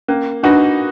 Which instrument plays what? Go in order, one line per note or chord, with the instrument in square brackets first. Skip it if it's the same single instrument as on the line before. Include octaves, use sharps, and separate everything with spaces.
[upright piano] A#3 [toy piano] C#4
[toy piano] D4 [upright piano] D#4 F#4 B4